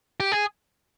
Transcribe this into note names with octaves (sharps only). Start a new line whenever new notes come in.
G4
G#4